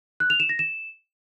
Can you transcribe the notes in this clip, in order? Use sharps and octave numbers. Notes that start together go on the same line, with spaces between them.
F#6
F7
E7
A#6
E7